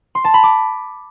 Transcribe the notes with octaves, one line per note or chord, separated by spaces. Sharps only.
C6
A5
B5
D6